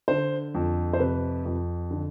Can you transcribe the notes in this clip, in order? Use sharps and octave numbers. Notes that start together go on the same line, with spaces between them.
D3 C5
F2
C5
C3 B4
F2
D3